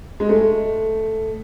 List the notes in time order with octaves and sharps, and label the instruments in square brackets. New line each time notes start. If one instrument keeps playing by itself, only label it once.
[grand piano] G#3
A3